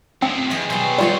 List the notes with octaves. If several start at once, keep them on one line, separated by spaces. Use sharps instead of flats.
D2 F3 C4
E2 G#4 D#5
B2 F#3 G3 C5
F3 G3 F4 C#5 D5 C6